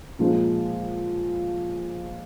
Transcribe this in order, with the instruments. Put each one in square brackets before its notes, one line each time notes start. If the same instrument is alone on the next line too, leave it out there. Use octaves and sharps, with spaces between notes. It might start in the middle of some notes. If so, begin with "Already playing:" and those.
[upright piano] A#2 F3 G#3